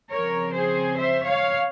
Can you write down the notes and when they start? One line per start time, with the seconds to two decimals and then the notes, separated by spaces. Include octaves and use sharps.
0.12 C#3 F3 C4 A#4 C#5
0.54 G#4 C5
0.97 C5 E5
1.25 C#5 F5